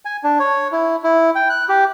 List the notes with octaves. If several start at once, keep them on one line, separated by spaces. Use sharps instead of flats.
G#5
D4
C#5
E4
E4
G5
F#6
G4